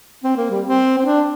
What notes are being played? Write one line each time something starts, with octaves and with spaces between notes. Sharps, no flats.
C4
A#3
G3
C4
C4
D4